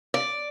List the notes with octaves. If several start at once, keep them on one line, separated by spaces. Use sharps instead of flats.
D5